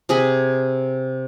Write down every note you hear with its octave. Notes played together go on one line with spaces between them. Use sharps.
C3 G#4 G#5 B5